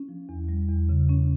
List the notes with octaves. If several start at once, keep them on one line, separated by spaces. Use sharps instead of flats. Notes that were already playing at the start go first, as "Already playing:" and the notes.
Already playing: C#4
F3
E2
G3
E2
C#3
C#4